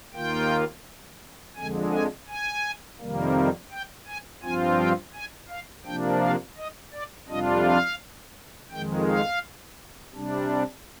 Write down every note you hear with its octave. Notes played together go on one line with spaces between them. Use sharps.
D#2 D#3 A#3 F4 G5
F2 D3 G#3 G#5
G#5
G#5
F2 C3 D#3 G3 A#3
G5
G#5
G2 F3 C4 F4 G#5
G5
G#5
F5
C3 F3 A#3 D4 G5
F5
D#5
D5
F2 C3 G3 D4 F4 D#5
F5
F2 D#3 G#3 G5
F5
C3 G3 D4